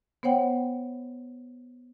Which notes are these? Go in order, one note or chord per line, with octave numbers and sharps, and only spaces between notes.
B3 C5 C#5 F#5 G5